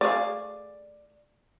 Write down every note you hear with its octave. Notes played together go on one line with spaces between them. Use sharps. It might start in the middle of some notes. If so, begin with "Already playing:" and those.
A3 G#4 D5 F5